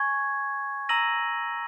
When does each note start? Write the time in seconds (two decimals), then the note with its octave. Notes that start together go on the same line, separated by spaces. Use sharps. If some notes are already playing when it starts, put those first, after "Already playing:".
Already playing: G#5 C#6 G#6
0.89 A#5 E6 A#6 D#7 F#7